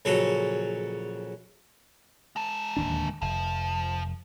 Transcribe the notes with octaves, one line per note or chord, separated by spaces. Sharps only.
A#1 C#3 F#3 F#4 A4
G#3 A5
D1 D#2 D4
F1 F3